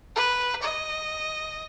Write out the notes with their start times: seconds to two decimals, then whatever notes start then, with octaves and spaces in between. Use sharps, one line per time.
0.16 B4
0.62 D#5